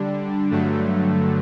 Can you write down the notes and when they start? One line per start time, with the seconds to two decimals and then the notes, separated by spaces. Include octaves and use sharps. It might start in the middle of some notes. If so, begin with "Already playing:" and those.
Already playing: D3 G3 D4
0.51 G2 D3 F#3 A3